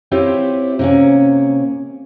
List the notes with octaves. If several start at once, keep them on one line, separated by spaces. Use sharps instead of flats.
C4 E4 F4 G4 C5 C#5
C3 A#3 C#4